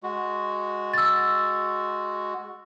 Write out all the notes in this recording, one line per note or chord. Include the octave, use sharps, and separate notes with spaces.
G#3 F#4
E6 A6